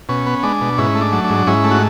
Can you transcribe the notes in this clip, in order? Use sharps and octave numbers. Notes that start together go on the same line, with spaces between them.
B2 C#4
B3
G#3 D4
B2
G#2 C#4 E4
A3
D4
F#3
D4
G#2
G#2 C#4 E4
A3
F#4